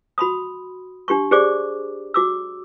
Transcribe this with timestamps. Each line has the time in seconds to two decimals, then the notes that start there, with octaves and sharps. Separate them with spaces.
0.18 F#4 B5 C6 D#6
1.08 D4 G4 C6 C#6
1.31 G4 G#4 C5 D5 D6
2.14 F#4 D6 E6